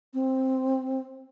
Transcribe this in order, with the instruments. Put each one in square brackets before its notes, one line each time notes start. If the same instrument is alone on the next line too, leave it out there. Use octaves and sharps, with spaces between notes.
[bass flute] C4